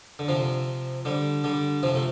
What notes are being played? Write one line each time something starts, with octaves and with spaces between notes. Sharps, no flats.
D3
C3 F3
D3 G3
D3 G3
C3 F3
A3